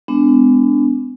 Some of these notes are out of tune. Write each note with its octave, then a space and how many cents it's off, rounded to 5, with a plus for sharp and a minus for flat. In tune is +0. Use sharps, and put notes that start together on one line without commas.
G#3 +0 B3 +40 D4 +0